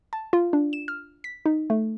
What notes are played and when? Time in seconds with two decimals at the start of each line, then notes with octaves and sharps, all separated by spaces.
0.13 A5
0.33 F4
0.53 D4
0.73 E7
0.88 F6
1.24 B6
1.46 D#4
1.70 A3